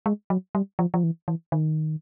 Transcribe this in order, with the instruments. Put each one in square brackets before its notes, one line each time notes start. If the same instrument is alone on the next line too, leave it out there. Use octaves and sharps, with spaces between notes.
[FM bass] G#3
F#3
G3
F3
F3
E3
E3
D#3